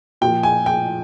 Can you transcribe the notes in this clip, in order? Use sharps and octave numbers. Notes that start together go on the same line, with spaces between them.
A#2 F3 G5
G#5
G5